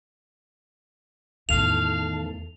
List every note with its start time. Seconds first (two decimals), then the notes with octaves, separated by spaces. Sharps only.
1.49 E2 A2 D#3 A4 F5 F7